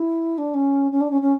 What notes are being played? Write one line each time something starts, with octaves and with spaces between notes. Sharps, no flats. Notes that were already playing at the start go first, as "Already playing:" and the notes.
Already playing: E4
D4
C#4
C#4
D4
C#4
C#4